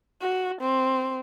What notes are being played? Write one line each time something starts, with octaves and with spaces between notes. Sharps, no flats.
F#4
C4